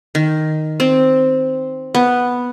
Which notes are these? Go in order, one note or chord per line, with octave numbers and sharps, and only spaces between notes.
D#3
C4
B3